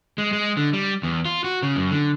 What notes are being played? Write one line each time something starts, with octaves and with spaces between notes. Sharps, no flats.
G#3
G#3
D3
G3
E2
F4
F#4
C#3
F#2
D3